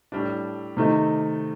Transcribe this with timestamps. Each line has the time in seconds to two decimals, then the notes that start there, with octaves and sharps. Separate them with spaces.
0.12 A2 G3 D4
0.77 C3 D#3 A3 D#4